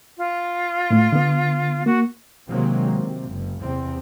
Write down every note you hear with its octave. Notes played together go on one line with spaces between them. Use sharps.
F4
A2 A3
D3 B3
A#3 F#4
C3 D#3 F#3 G#3 A#3 C4
C3
F#1
E2 C3 C4